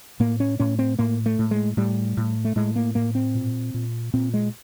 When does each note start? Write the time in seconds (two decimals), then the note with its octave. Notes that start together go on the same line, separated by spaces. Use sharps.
0.20 A2 A#3
0.40 C#4
0.59 A2 C#4
0.79 C4
0.99 A2 A#3
1.26 A3
1.39 A2
1.51 G#3
1.77 A2 G3
2.17 A2
2.45 A3
2.56 A2 G#3
2.76 A#3
2.95 A2 A#3
3.15 C4
3.35 A#2
3.74 A#2
4.14 A#2 C4
4.34 G#3